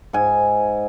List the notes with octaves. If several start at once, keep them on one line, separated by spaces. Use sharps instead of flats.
G#2 G#5